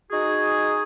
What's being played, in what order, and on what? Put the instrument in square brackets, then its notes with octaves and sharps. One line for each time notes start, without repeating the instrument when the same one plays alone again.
[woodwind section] D#4 F#4 G#4